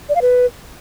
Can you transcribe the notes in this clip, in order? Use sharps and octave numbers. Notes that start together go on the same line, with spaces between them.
D5
F5
B4